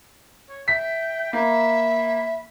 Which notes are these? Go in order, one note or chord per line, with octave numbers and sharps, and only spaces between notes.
C#5
E5 G5 B6
A#3 E5 B5